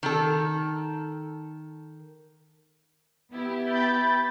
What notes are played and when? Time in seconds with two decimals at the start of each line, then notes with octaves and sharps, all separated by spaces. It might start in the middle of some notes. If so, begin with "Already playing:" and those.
0.03 D#3 A4
3.31 B3 E4 G4
3.66 B5 G6 A6